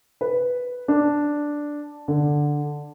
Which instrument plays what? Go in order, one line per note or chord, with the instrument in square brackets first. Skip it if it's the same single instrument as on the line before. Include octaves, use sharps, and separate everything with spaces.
[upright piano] B4
D4
D3